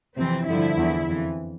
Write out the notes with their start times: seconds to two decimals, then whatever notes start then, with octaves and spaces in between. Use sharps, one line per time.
0.17 F2 C3 E3 C4
0.47 G2 D3 F3 E4
0.78 E2 D3 F3
1.09 F2 E3